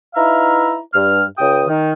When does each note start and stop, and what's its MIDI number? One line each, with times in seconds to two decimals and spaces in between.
0.15 0.77 63
0.15 0.77 64
0.15 0.77 71
0.15 0.77 76
0.15 0.77 77
0.15 0.77 82
0.94 1.22 43
0.94 1.22 89
1.38 1.63 37
1.38 1.63 79
1.38 1.63 87
1.67 1.93 51